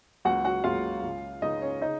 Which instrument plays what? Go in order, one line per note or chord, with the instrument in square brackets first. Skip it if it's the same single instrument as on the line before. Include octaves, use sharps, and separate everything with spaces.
[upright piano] C#2 C#3 F#3 A#3 F#4 F#5
F#4 F#5
C#2 C#3 F#3 A#3 F4 F5
C#2 C#3 G#3
C#2 C#3 G#3 D#4 D#5
C#4 C#5
C#3 D#4 D#5